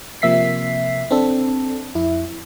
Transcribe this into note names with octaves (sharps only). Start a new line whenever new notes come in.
C3 F3 A#3 E5 B6 C7
C4 D4 A4
F2 E4